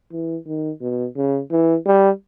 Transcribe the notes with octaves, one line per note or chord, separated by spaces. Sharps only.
E3
D#3
B2
C#3
E3
G3